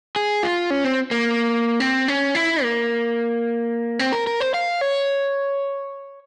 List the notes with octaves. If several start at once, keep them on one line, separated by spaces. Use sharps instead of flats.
G#4
F4
C#4
C4
A#3
C4
C#4
E4
A#3
C4
A#4
A#4
C5
F5
C#5